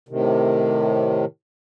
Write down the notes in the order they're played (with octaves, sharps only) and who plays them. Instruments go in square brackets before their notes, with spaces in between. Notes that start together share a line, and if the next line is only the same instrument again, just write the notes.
[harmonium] A2 C3 D#3